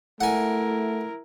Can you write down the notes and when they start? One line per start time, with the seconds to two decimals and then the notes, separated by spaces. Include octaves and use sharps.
0.21 A3 E4 A#4 F#5 G#5